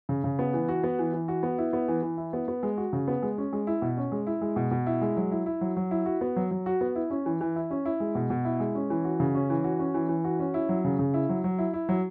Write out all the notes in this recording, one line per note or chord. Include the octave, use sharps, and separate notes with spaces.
C#3
C#3
B3
E3
F#4
B3
E3
E3
F#4
B3
E4
B3
E3
E3
E4
B3
B3
G#3
F#4
C#3
B3
G#3
C#4
G#3
E4
B2
C#4
G#3
E4
G#3
B2
B2
E4
G#3
F#3
E4
E4
F#3
F#3
E4
F#4
B3
F#3
F#3
F#4
B3
E4
C#4
E3
E3
E4
C#4
E4
G#3
B2
B2
E4
G#3
C#4
E3
F#4
C#3
C#4
E3
F#4
C#4
E3
E3
F#4
C#4
E4
F#3
C#3
C#3
E4
F#3
F#3
E4
E4
F#3